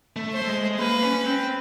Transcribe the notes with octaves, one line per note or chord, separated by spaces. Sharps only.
A3
C5
A3
G#3
A#3 B4
C#4
C4